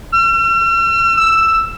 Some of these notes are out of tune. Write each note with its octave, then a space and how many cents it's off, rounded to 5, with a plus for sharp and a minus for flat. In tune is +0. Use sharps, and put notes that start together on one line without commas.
E6 +45
E6 +5